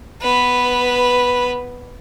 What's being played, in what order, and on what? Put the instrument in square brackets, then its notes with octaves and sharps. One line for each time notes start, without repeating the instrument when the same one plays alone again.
[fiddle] B3 B4